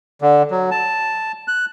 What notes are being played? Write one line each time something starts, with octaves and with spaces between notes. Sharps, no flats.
D3
F#3
A5
F#6